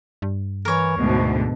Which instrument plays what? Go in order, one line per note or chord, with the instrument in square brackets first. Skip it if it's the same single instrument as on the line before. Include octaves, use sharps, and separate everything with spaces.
[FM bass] G2
[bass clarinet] E3 [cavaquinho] A#4 C#5
[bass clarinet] D2 [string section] G#2 B2 D3